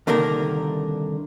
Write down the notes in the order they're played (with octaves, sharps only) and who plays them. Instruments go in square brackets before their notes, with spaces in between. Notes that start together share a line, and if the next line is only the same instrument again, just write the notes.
[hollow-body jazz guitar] C2 D3 D#3 A#3 A#4